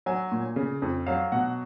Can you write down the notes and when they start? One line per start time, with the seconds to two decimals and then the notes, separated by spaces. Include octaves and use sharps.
0.06 F#3 G#5
0.32 A#2
0.56 C#3
0.82 F2
1.07 F#3 F5
1.32 B2 F#5